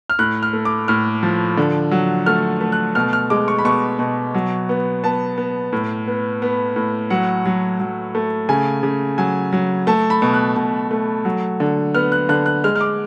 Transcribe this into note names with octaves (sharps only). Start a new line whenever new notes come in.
F6
A2 F#6
F6
A3
D6
A2 F6
F3
D3
F#3
A3 F6
A3
F#6
B2 F6
F6
G#3 D6
C#6
B5
B2 C#6
B2
F#3
B3
B3 A5
B3
A2
B3
B3
A2
F#3 F#5
F#3
F#3
A3
C#3 G#5
C#3
F#3 G#5
F#3
A3 A5
B5
B2
F#6
B2
A3
F#3
D3
B3 F6
F#6
D3 F#6
F#6
G#3 F6
F6
D6